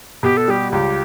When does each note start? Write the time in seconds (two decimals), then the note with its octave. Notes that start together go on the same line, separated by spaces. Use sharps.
0.23 B2 G4
0.37 A4
0.48 G3 G4
0.72 C#2 G4